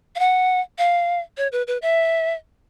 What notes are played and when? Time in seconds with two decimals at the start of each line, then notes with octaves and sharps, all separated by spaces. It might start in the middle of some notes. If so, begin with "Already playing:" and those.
0.15 F5
0.19 F#5
0.78 F5
1.37 C#5
1.52 B4
1.67 B4
1.82 E5